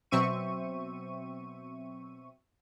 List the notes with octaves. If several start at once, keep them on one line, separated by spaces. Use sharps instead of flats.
B2 F#3 C4 E5 C#6 D#7